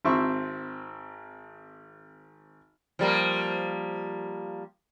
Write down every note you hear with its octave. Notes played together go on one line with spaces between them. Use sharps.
G#1 C4 E5 C#6
F3 G3 A#3